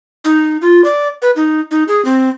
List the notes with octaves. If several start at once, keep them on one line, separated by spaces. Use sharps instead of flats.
D#4
F4
D5
B4
D#4
D#4
G#4
C4